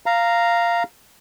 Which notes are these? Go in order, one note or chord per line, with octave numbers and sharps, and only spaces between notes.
F5 A#5